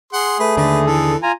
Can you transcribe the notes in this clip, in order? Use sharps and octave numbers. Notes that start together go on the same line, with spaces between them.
G#4 F#5 C6
A3 B4
D#2 D3 B4 D5
E3 A4
F4 G#5 A#5